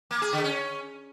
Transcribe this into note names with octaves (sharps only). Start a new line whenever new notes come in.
A#3
G#4
D3
C#4